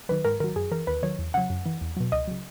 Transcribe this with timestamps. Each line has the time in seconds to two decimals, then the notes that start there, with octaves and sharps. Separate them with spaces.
0.09 D#3 F#3 B4
0.25 G#2 A#4
0.40 D#3 F#3 A#4
0.56 F#2 G#4
0.71 E3 A#4
0.87 D#2 B4
1.03 D#3 F#3 C#5
1.18 E2
1.34 C#3 F#3 F#5
1.50 F#2
1.66 E3
1.81 E2
1.96 B2 F#3
2.12 C#2 D#5
2.28 C#3 F#3